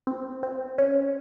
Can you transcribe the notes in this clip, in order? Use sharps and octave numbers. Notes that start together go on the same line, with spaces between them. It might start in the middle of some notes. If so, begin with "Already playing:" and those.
C4
C4
C#4